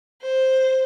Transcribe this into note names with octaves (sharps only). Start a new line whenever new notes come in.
C5